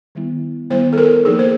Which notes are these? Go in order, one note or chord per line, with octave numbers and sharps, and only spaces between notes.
D#3 G3 B3 E4
D#3 G3 B3 E4 C5
A4
A#4
F3 A#3 D#4 G#4
C5